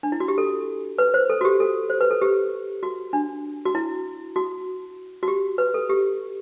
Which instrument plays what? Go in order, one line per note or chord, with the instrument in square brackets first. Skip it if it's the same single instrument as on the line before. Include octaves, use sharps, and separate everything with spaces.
[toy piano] D4
E4
F#4
G4
A4
B4
C5
A4
F#4
G4
A4
C5
B4
A4
G4
F#4
D4
F#4
E4
F#4
F#4
G4
B4
A4
G4